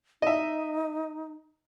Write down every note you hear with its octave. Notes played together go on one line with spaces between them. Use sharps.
D#4 D#5 E5